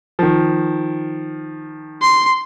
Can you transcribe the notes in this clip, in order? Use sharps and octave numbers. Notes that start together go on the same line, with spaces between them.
D#3 F3
C6